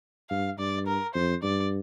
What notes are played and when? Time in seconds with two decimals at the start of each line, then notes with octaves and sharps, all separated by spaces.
0.30 G2 F5
0.59 G2 D5
0.87 A#4
1.14 F2 C5
1.43 G2 D5